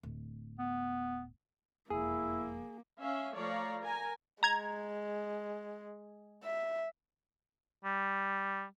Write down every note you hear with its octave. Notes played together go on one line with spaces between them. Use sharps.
D1
B3
E1 F2 A#3 E4 G#4
C#4 E5 F5
F3 A3 C#5 D5 F5 A#5
A#4 G#5 A#5
G#3 A#5 G#6
E5
G3